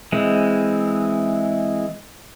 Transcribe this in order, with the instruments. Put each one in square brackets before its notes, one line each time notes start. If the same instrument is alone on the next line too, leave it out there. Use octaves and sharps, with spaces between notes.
[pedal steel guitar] E3 G#3 C4